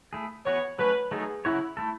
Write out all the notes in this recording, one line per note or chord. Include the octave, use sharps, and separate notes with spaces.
A3 E4 G#4
E3 B3 F#4 B4 C#5
F#3 A3 C#4 B4
F#3 A3 D#4 G#4 A4
C#3 F#3 C#4 E4 F#4 C#5
A3 E4 A4